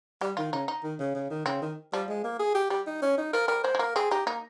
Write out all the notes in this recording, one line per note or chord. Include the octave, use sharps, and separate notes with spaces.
G3 G4
D#3 F4
C#3 D#4
D#4
D#3
C#3
C#3
D#3
C#3 C4
D#3
F3 G3
G#3
A#3
G#4
G4
G3 G4
D#4
C#4
D#4
F3 A#4
G3 A#4
G#3 C5
G#3
A#3 A#4
C4 G#4
D#4 G4
A#3 D#4